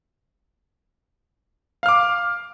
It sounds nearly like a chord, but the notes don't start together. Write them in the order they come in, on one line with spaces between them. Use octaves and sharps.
F5 F6 D6